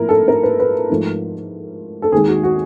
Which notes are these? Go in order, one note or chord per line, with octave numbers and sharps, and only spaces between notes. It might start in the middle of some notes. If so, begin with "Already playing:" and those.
Already playing: A2 F3 A#3 E4 A#4
A4
A#4
B4
B4
G#2 F3 A3
A4
D#2 D#3 G#3 G#4
F#4
F#4